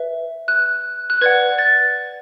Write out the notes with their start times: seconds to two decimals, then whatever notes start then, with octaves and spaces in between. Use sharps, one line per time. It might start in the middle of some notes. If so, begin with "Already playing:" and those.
Already playing: B4 E5
0.48 F#6
1.10 F#6
1.21 B4 D5 F#5 G#6
1.58 A6